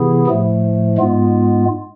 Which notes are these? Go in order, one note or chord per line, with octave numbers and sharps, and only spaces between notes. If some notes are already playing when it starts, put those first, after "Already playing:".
Already playing: C3 E3 B3 E4 G#4
A2 F3 A3
G#2 G#3 B3 F4